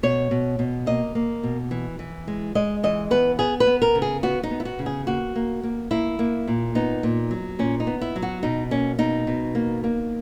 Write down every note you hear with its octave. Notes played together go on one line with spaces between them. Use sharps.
B2 C#5
B2
B2
A#3 D#5
A#3
B2
E3
E3
G#3
G#3 D#5
E3 D#5
B3 B4
B3 G#4
B4
B3
A#4
C#3
G#4
B3 F#4
D#4
B3
E4
F#4
C#3
G#4
A#3 F#4
A#3
A#3
A#3 E4
A#3
A#2
B3 D#4
A#2
F#3
A#2 C#4
D#4
B3
E4
F#3
F#4
B2 D#4
A#3 C#4
B2 D#4
B2
A#3
A#3